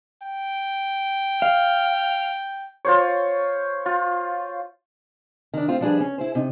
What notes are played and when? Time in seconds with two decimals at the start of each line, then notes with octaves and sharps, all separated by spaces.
0.23 G5
1.42 F5
2.85 F4 C5 C#5
3.86 F4
5.54 D#3 D4
5.68 A3 C4 F4
5.81 F3 G3 D4 E4 G#4 B4
6.00 C#4
6.18 E4 G#4 C5
6.35 C3 D#4